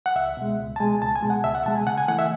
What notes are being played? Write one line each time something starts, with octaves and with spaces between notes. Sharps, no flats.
F#5
C#2 E5
B2 G#3
C#2
A5
B2 G#3 G#5
C#2 A5
G#5
B2 G#3
F#5
C#2 E5
F#5
B2 G#3 A5
G#5
C#3 F#5
G#5
E3 A3 F#5
E5